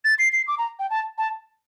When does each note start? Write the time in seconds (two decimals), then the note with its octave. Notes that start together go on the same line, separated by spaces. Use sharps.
0.05 A6
0.19 C7
0.33 C7
0.48 D6
0.58 A#5
0.79 G5
0.90 A5
1.18 A5